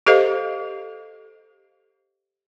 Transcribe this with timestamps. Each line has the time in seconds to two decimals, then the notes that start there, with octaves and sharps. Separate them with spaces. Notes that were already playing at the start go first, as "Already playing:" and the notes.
0.07 G4 A4 C5 D#5 F5